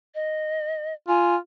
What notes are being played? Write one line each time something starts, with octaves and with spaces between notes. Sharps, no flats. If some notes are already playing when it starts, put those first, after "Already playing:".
D#5
F4 G#5